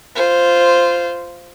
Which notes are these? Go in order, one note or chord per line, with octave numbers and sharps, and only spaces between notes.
F4 C5